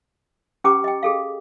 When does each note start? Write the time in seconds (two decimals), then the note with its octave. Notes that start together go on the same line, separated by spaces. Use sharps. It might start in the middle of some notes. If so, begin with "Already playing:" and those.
0.64 C#4 G4 B4 G5 A#5 D6
0.84 D#5 G5
1.03 G#4 A4 F5